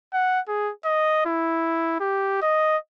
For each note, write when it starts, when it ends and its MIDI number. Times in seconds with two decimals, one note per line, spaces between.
0.13 0.40 78
0.48 0.71 68
0.85 1.24 75
1.26 1.96 64
2.00 2.40 67
2.42 2.77 75